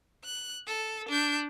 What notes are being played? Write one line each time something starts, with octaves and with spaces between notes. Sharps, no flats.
F#6
A4
D4 G6